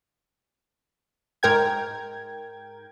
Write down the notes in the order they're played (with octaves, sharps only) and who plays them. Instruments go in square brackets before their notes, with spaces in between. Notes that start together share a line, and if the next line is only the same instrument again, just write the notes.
[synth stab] G#2 A#4 G5 G#6